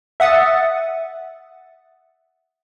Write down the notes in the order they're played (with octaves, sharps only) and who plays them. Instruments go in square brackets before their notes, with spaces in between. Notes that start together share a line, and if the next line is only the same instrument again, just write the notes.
[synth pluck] E5 F#5 D#6 A6 C#7